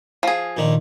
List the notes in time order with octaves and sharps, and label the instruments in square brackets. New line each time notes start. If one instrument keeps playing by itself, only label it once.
[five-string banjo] F3 G#4
[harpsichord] A#1 A#2 D#3